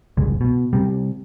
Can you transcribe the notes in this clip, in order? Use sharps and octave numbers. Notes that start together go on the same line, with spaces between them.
F#1 C2 G#3
B2
C3 G3